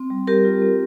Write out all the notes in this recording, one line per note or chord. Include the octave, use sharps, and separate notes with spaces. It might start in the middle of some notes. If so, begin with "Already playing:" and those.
Already playing: C4
G3
G3 G4 A#4
F4
C4